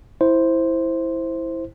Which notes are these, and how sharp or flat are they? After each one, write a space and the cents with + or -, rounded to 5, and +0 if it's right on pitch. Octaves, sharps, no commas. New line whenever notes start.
E4 -5 C5 +0